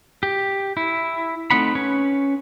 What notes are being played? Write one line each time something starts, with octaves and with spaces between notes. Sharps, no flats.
G4
E4
A3 C4 D#4 F#5 B5
C#4 B4 C#5